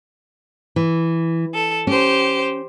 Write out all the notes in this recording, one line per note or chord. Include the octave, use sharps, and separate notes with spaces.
E3
A4
C#4 G4 C5